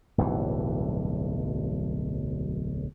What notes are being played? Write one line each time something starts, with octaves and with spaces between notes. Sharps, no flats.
D1 B1 G2 E3